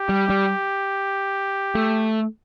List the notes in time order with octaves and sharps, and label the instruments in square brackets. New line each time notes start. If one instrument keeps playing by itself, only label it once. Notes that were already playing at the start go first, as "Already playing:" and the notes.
Already playing: [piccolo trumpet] G4
[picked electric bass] G3
G3
A3